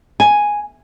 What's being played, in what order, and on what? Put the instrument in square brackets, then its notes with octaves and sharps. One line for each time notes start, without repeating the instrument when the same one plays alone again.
[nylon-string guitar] G#5